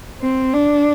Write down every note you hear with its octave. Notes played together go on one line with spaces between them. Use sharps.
C4
D4